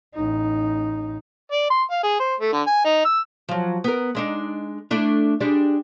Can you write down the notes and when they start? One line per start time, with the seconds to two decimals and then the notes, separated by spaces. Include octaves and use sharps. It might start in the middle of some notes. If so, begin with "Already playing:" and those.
0.14 A1 D#4
1.52 D5
1.70 C6
1.91 F5
2.03 G#4
2.20 C5
2.40 A3
2.53 D3
2.67 G#5
2.85 D#4
3.04 E6
3.49 F3 F#3
3.84 B3 A#4
4.15 G#3 D4 D#4
4.91 A3 D4 E4
5.41 G3 G#3 D4